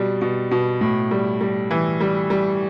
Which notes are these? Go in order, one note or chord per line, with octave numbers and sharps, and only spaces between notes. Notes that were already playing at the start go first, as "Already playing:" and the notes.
Already playing: B2 G3
B2
B2
A2
G3
G3
E3
G3
G3